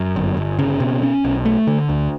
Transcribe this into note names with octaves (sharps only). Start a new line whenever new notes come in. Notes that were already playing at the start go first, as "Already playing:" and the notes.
Already playing: F#2
G1
G1
C#3
B2
C#4
B1
A3
D3
D2